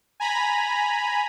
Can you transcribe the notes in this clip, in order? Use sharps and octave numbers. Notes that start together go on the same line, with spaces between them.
G#5 A#5 B5